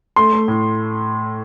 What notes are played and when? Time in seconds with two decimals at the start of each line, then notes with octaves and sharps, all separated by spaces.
0.16 A3 C6
0.33 A3
0.48 A2